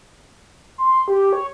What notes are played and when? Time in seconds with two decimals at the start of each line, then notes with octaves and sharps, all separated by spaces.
0.78 C6
1.08 G4
1.33 C#5